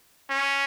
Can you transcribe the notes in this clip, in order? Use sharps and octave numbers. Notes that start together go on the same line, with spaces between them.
C#4